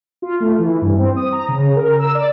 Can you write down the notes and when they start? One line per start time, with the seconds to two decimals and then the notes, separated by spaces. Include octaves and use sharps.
0.22 F4
0.40 A3
0.58 E3
0.81 G2
0.98 C4
1.16 D#6
1.32 A#5
1.48 C#3
1.76 A#4
1.99 E6
2.15 D5